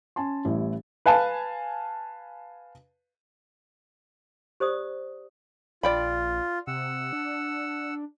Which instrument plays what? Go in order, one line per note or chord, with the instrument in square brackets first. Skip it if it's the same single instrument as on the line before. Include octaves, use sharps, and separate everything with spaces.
[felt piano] C#4 G#5 A5 C6
A1 G3 E4
[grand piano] B4 F5 G#5 A5
[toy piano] G4 C5 D5 D#6
[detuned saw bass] A#1 [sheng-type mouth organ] F4 [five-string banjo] D5 G5 B5
[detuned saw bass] C3 [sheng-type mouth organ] F#5 E6
[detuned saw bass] D4